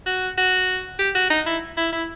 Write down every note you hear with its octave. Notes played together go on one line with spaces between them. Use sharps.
F#4
F#4
G4
F#4
D#4
E4
E4
E4